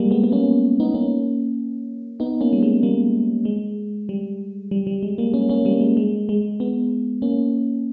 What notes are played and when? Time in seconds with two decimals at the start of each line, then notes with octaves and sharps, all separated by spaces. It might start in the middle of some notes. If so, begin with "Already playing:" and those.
Already playing: G3 G#3 A#3
0.11 G#3 B3
0.24 B3
0.32 A#3 C#4
0.80 B3 D#4
0.94 A#3 C#4
2.20 B3 D#4
2.41 A#3 C#4
2.53 G3
2.63 G#3
2.83 G3 A#3
3.45 G#3
4.09 G3
4.71 G3
4.87 G3
5.03 G#3
5.18 G3 A#3
5.34 A#3 C#4
5.49 A#3 C#4
5.65 G3 A#3
5.81 G#3
5.97 G#3
6.29 G#3
6.60 G#3 B3
7.22 A#3 C#4